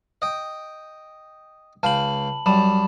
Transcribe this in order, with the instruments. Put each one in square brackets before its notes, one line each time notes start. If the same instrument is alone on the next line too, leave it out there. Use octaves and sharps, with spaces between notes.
[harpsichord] D#5 G5
[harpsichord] C#2 F5 G5 [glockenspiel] A5 B5 F#7
[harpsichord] F#2 G3 [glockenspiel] A5 B5 E7